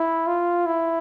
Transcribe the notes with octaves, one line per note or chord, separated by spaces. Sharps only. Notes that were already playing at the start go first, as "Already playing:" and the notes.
Already playing: E4
F4
E4